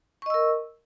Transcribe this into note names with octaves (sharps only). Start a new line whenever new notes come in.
A#4 D#5 C#6 E6